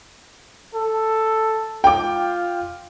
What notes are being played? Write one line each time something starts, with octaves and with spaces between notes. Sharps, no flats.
A4
F4 G5 D6